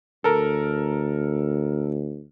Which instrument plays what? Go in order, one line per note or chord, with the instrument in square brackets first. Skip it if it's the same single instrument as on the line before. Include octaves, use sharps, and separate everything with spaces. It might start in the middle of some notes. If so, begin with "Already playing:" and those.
[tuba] D2 [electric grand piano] A4 A#4